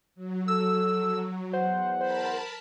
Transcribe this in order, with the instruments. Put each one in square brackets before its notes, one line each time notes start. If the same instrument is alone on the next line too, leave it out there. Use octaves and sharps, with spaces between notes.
[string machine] F#3
[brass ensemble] A4 [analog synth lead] E6
[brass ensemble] E2 F#5 [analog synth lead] C5
[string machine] A#4 A5 B5 [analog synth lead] C5